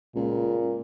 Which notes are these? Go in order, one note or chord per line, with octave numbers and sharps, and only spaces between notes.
C#2 A#2